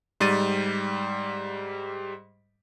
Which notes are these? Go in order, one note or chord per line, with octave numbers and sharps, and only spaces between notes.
G#2 G3 A6 D#7